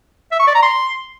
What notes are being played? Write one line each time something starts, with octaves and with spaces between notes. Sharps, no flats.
E5
C#6
D5
A#5
C6